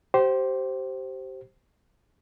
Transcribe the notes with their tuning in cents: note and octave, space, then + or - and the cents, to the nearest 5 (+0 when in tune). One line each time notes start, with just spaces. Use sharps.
G4 -25 C5 +5